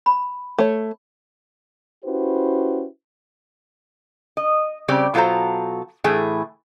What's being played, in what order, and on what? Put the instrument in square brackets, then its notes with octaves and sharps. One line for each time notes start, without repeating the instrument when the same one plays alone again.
[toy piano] B5
[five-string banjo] A3 C#5
[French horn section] C#4 E4 F#4 G4 B4 C5
[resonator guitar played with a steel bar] D#5
C#3 G3 C4 G4 D5
B2 F#3 F4 A4 C5 A#5
A2 E3 A3 G#4